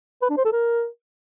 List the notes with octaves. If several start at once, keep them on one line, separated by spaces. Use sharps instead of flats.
B4
D4
C5
A4
A#4